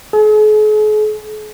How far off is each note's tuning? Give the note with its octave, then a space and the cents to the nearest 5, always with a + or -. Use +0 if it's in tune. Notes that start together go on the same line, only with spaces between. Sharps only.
G#4 +45